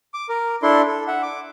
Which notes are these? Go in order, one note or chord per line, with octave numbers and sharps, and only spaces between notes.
D6
A#4
D4 E4 A4 C6
A4
E5 F#5
D6